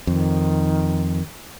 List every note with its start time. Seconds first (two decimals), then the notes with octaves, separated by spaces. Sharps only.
0.07 F2 D#3